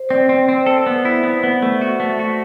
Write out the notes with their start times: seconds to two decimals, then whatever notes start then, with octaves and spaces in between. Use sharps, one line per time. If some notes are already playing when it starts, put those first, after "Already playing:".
Already playing: C5
0.10 C4 D5
0.29 C4
0.49 C4
0.66 A4
0.86 B3
1.05 E4
1.23 B3
1.43 B3
1.62 A3
1.81 F#4
2.00 A3
2.19 F#4